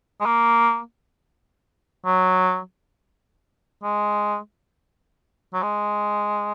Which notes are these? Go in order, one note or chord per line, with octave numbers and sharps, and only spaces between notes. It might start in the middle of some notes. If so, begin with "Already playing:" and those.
G#3
A#3
F#3
G#3
F#3
G#3